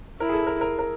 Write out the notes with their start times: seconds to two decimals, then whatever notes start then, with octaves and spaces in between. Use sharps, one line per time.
0.20 E4 A#4
0.29 G#4
0.33 A4
0.47 A#4
0.61 A#4
0.79 A#4